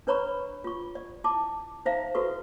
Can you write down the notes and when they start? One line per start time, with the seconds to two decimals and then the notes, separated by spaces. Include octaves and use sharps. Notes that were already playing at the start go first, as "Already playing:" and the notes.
0.07 D4 B4 C#5 A#5 B5 C#6
0.64 F4 C#6
0.95 D5
1.24 E4 A5 D6
1.86 D#4 C5 E5 F5 A#5
2.15 E4 F#4 A4 B4 C#6